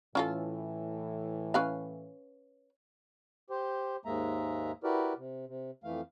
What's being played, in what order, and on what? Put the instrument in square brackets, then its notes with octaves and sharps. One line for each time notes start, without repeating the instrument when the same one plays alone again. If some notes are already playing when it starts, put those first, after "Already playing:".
[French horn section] A2 E3 [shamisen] C#4 F4 A4
[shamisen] C#4 B4 F5
[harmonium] G4 C5
D#2 G#2 G#3 A#3 E5 A#5
E4 F#4 G4 A#4 B4 D5
C3
C3
F2 E3 A3 F5